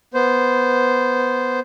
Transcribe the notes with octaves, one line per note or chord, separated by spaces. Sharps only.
B3 C5